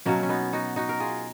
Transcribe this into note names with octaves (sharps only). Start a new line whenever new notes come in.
B2 F#3 A#3 C#4
C#4
B3 D#4
D#4 F#4
D#4 F#4
A#4
F4 G#4